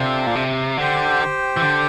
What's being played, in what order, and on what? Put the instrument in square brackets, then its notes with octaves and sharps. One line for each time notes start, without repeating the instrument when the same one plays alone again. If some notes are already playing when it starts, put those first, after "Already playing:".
Already playing: [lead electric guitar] C3 [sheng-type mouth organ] D4 F4 A4 C5
[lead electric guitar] A#2
C3
[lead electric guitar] D3 [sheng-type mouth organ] G4 C5 G5
[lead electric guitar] E3
D3